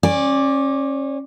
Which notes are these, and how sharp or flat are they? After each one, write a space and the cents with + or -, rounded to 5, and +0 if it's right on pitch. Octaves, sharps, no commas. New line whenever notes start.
C#4 -30 D5 +0